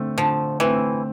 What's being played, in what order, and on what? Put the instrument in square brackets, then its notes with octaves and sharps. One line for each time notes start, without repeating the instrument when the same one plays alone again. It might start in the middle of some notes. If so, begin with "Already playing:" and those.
Already playing: [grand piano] D3 A3 C4
[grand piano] D3 [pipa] F3
[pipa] E3 [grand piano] A3 C4